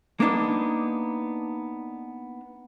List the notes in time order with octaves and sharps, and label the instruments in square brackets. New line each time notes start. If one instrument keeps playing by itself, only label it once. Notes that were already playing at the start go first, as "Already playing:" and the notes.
[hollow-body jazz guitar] A#3 B3 D4 D#4